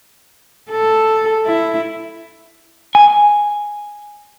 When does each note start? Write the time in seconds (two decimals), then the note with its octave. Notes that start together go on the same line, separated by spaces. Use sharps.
0.70 A4
1.46 E4
2.95 G#5